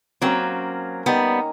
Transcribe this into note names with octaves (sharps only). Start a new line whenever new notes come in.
F#3 A#3 C4 C#4 A#4
D#3 G3 B3 G#5 A#5